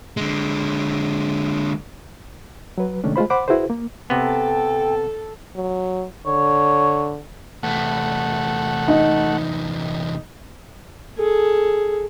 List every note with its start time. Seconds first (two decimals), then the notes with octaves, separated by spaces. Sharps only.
0.17 D3 G#3
2.78 F#3 B4
3.04 C3 D#3 G#3 A3 C#4 D4
3.16 G#3 A3 F4 C5 B5
3.30 C5 F#5 B5 D6
3.48 E4 F#4 G#4 B4 C5
3.70 A#3
4.10 C3 B3 A4 G5
5.56 F#3
6.26 D3 C#5
7.63 E2 C3 A3 F#5
8.88 D#4
11.18 G#4 A4